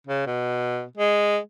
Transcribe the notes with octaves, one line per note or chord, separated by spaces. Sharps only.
C#3
B2
G#3